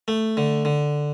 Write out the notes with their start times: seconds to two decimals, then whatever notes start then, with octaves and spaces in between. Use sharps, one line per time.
0.08 A3
0.37 D3
0.65 D3